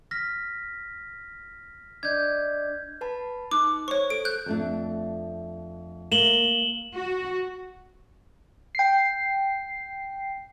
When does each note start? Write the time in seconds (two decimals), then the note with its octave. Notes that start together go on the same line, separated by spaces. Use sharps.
0.11 F6 A#6 B6
2.03 D4 D5 D#5 G6 G#6
3.01 B4 A5 B5
3.51 D#4 D6 F#6
3.88 C5 C#5 C#6
4.10 A4 D7
4.25 F#6 G6
4.46 F2 A3 D4
6.12 A#3 E7 F#7 G7
6.94 F#4
8.75 G5 C7